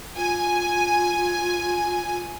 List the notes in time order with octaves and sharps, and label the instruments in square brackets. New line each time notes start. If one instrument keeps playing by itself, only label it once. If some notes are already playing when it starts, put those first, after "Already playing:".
[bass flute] F4 [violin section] G#5